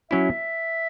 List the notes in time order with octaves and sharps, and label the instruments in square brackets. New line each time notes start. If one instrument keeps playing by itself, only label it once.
[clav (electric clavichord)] F#3 C#4 E4 [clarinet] E5